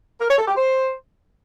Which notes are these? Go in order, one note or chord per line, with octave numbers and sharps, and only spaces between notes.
A#4
C#5
A4
G4
C5